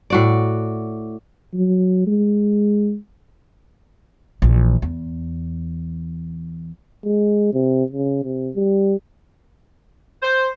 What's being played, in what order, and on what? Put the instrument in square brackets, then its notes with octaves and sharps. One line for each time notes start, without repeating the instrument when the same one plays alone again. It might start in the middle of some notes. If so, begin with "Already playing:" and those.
[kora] A2 F#4 D5
[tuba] F#3
G#3
[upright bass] A#1 E3
E2
[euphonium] G#3
C3
C#3
C3
G3
[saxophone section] C5